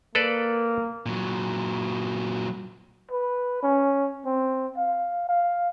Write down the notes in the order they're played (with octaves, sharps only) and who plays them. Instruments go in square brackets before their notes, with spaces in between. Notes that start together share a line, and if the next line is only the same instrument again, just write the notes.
[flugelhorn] A#3 [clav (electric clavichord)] A4 B4 D5
[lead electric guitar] A#2 F#3
[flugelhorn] B4
C#4
C4
F5
F5